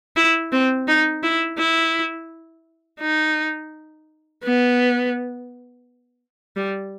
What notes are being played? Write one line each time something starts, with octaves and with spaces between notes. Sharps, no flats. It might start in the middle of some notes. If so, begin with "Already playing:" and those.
E4
C4
D#4
E4
E4
D#4
B3
G3